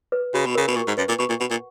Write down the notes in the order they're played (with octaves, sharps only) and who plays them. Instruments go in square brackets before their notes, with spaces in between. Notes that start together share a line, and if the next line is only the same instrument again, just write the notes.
[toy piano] B4
[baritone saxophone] C#3 [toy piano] F#4
[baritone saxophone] B2
[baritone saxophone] C#3 [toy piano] A#4
[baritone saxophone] B2
[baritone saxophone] A#2 [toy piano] C#6
[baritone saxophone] G#2
[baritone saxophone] F#2 [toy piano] B4
[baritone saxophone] A#2
[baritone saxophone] B2 [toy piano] C#6
[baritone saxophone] A#2
[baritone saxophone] B2 [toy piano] F#5
[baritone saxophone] A#2